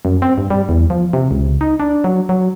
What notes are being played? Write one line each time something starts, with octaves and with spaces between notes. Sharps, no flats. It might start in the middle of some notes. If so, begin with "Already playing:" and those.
F#2
C4
G2
G3
E2
F3
C3
C#2
D#4
D4
F#3
F#3